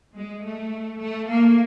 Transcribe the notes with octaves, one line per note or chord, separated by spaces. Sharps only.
G#3
A3
A3
A#3